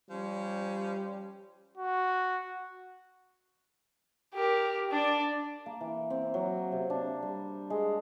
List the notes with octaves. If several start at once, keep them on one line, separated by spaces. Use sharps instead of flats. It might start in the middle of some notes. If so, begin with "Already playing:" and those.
F3 G3 C#4
F#4
G4 A#4
D4 D5
A#3
E3
C4
F#3
C3
D4
G3
G#3